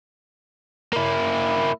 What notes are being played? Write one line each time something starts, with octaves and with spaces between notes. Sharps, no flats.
A#3 E4